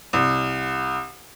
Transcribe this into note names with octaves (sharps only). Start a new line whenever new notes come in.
C2